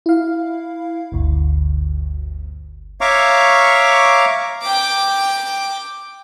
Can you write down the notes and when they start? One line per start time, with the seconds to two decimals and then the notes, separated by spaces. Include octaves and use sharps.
0.06 E4 F5
1.12 G1 D2
3.01 C#5 E5 F5 A#5 C#6 D6
4.62 G5 D6